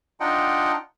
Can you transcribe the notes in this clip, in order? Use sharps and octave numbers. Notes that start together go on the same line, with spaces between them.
D4 D#4 F4 D#5 F#5 G5